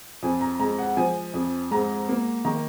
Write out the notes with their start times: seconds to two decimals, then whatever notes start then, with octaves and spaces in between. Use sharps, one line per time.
0.23 F2 G#5
0.41 A#5
0.59 G#3 A#5
0.79 F#5
0.97 F3 G#5
1.34 F2
1.71 G#2 A#5
2.09 A#3
2.45 D#3 A#5